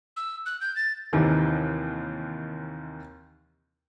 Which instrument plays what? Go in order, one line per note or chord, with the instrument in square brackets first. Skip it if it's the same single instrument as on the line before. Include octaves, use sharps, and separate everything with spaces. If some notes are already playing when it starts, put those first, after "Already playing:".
[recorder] E6
F#6
G6
A6
[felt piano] D#2 C3 D#3 E3